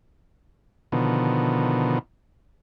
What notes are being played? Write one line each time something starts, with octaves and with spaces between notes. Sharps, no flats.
B2 D3 D#3 F3 B3